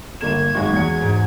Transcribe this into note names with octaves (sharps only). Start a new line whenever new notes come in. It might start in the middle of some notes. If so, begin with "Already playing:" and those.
G1 A#3 G#6 E7
G#1 G#3 F#4
E2 C#7
G#2